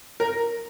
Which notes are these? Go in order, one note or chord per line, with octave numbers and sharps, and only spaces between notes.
A#4